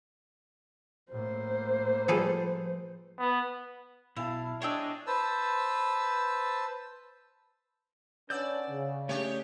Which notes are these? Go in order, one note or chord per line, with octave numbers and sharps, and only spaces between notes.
A2 A#3 C5
F3 G3 G#4 A4 B4
B3
B1 B2 E4 F5 A5
D4 G#4 C#5 D#5 G5 E6
B4 C5 A5 E6
C#4 D4 B4 D5 F#5 E6 G6
C#3
A3 C#4 D4 G4 G#4 C#5